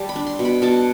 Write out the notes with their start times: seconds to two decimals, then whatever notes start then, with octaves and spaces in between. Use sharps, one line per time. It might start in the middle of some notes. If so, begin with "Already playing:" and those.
Already playing: G3 A5
0.09 B5
0.16 D4
0.27 C6
0.39 B2
0.45 B5
0.62 B2 A5